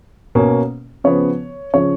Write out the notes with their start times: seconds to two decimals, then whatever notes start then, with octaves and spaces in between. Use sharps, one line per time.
0.35 B2 A#3 C#4
1.04 C#3 F3 B3 C#5
1.74 C#3 F3 C#5